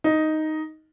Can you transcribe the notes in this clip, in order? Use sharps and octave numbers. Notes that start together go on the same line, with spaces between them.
D#4